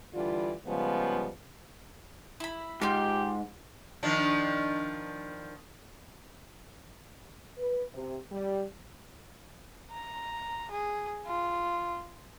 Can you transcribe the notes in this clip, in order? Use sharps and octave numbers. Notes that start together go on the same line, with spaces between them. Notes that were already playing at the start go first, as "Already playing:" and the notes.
D3 E3 G3 F4 D5
C#3 F3 G3 G#3 B3
E4 B5
G#2 F4 G4 G5 F6
D#3 F3 D4
B4
C3
G3
A#5
G#4
F4